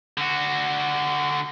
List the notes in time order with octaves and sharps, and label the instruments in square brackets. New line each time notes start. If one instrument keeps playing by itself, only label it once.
[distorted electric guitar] D3 F#4